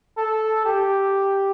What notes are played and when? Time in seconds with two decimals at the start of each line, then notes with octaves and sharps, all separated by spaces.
0.17 A4
0.66 G4